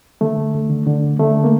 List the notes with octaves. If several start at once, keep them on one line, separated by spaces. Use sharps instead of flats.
D3 A3
D2
D2
D3
D3
D2
D3 A3
A#3